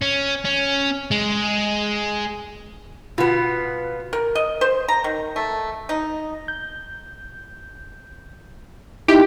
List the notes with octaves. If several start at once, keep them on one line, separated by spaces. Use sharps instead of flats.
C#4
C#4
G#3
B2 B3 F4
A#4
D#5
C5
A#5
D#3
A3
D#4
G6
D#4 E4 G4